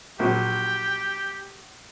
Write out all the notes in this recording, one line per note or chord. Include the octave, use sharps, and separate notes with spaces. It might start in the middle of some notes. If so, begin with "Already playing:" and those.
A#1 F#3 G4